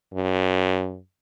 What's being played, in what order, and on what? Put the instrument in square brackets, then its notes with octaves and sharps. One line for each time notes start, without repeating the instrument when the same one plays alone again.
[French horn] F#2